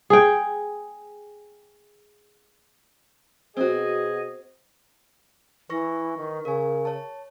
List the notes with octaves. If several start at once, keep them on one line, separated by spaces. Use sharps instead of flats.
G#4 G5
B2 C4 F#4 G#4 D#5
E3 B4 C#6 A#6
D#3
C#3 A#4 G#5
C#5 A5